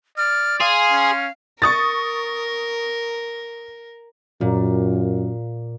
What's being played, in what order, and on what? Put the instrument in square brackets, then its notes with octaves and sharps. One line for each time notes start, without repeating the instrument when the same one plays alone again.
[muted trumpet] D5 [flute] F6
[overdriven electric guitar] G#4 [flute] F5 [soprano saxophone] C6
[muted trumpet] C#4
[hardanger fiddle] A#4 [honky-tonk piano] C#6 D#6 A6
[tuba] F#2 [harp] A#2